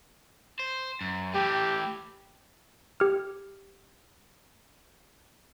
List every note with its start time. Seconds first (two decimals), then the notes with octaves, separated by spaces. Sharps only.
0.59 C5
1.01 F#2
1.34 A2 E3 G4
3.00 G4 F6